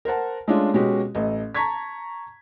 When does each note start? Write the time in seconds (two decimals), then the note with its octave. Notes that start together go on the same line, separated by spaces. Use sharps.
0.05 A#4 C5 F#5 A5
0.48 G#3 A3 C#4 D4 F4
0.73 B2 G#3 C#4 F#4 G4
1.15 A1 A4 D#5
1.55 A5 A#5 C#6 G#6 B6